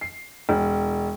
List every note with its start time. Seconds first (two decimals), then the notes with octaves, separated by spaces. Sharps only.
0.01 C7
0.49 E1